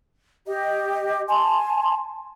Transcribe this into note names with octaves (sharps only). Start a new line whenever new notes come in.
G4 D#5
G#5 A5 C6